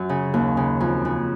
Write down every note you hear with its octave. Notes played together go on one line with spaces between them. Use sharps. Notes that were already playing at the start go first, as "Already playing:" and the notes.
Already playing: F#2
C#3
D#2
C#3
F2
C#3